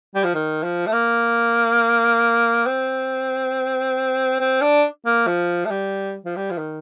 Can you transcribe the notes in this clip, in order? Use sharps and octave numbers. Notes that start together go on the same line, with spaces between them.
G3
F3
D#3
F3
A3
A#3
C4
C4
D4
A#3
F3
A3
G3
F3
G3
F3
D#3